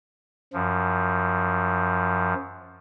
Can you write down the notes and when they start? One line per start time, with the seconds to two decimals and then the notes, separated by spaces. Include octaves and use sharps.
0.53 F#2 F3